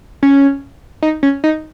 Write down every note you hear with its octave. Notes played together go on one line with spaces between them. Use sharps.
C#4
D#4
C#4
D#4